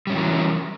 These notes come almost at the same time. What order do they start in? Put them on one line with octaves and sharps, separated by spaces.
G3 C#4 F#3 E3 A#4